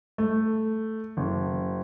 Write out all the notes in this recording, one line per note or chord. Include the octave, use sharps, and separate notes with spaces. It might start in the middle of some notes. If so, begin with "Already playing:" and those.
A3
F#1